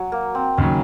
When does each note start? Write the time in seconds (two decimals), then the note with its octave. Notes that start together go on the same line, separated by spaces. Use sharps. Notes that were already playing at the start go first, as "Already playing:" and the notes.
Already playing: F#3
0.12 A#3
0.35 C4
0.57 D#2 C#3 F#3 C#4